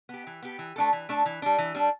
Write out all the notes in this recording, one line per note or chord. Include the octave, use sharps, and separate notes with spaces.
B3 G4
E3
B3 G4
E3
A3 D4 A4
E3
A3 D4 A4
E3
G3 D4
E3
G3 D4